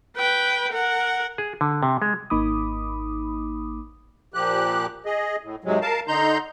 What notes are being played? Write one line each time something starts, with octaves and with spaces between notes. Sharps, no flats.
B4 G5
A#4 F#5
G#4
D3
C3
G#3
G#1 A#3 D#4 B5 D6 D#6
A#2 F3 G4 F#6
G#4 D#5
A2
G#2 C3 F#3 G#3
A#4 F5 A5
D3 D#4 A#5 C6 G6